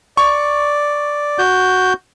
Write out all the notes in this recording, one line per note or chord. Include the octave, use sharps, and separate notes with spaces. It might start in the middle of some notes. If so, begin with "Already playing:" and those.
D5 C#6
F#4 G6